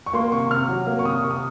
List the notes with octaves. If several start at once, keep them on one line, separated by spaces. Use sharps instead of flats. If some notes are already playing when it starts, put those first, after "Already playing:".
C#6
A#3 C6
C3 C#6
C3 F6
F#3
A#3
C#6
C3 D#6
C3 C#6
D#6